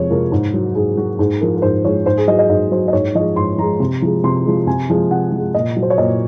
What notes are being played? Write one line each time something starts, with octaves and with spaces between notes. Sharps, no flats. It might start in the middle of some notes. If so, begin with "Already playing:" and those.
Already playing: F2 C3 F3 G#3 C#5
C3 F3 G#3 A#4
G#2
F#3
G#2 G#4
F#3 F#4
G#2 G#4
F3 G#3 A#4
A#4
G#2 C5
F3 G#3 C#5
G#2 C5
G#4
F#3 D#5
D#5
G#2 D#5
F#3 C5
D#5
G#2 C#5
F3 G#3 D#5
G#2 C6
F3 G#3 A#5
C3
F3 G#3
C3 C6
F3 G#3
C3 G#5
F3 G#3
C3 F#5
F3
G#3
A#2 D#5
F#3
C5
C#5
A#2 D#5